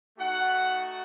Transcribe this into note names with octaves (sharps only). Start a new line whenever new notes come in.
A3 D#4 F#4 F#5